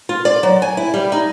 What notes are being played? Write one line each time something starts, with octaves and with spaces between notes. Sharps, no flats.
F4
D5
F#3
G#5
E4
G3
D#4